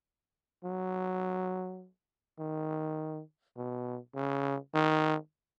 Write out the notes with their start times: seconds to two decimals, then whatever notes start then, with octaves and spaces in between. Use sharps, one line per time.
0.65 F#3
2.39 D#3
3.57 B2
4.15 C#3
4.74 D#3